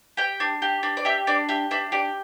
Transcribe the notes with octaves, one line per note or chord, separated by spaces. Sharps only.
G4 G5
D4
G4
D4
D5
G4 E5
D4 D5
G4 E5
D4 E5
G4 D5